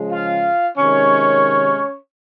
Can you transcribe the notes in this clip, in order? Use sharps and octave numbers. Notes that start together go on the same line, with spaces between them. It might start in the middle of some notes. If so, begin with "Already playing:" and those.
Already playing: C#3 F3 G#3
F4 F5
C3 D#3 G#3 C#4 C#5